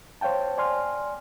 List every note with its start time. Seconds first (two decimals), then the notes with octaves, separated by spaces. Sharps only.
0.21 C5 C#5 F5 G5 A5
0.58 D5 G#5 C6 F6